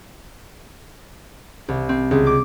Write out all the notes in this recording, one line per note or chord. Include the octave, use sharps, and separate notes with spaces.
C2
C4
C#2
D6